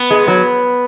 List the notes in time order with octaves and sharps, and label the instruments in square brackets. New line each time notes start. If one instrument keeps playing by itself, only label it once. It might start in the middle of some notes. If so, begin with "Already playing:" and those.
Already playing: [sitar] B3
[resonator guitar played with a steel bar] G#3
F#3